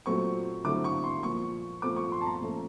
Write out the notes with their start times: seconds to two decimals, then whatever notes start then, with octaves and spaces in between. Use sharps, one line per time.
0.06 A#2 F#3 A3 C4 C#6
0.64 D3 F#3 A3 C4 E4 D6
0.84 C#6
1.04 C6
1.23 A#2 F3 A#3 C#6
1.82 A#2 F3 A3 C4 D6
1.96 C#6
2.12 C6
2.21 A5
2.26 A#5
2.41 A#2 F3 A3 C#4